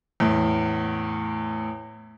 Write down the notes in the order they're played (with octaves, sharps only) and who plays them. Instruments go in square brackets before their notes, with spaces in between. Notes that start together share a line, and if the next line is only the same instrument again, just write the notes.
[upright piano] E2 A2